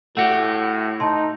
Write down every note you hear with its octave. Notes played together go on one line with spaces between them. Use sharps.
A2 A3 F#4 G4 F#5
D#4 A5 C6